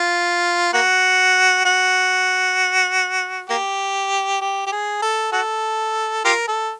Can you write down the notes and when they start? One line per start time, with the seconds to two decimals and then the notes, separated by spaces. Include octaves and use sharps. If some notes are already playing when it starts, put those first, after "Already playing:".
Already playing: F4
0.73 A#3 F#4
1.65 F#4
3.50 A#3 G4
4.41 G4
4.66 G4
4.72 G#4
5.02 A4
5.32 F#4 A4
6.25 F4 G4 A#4
6.48 A4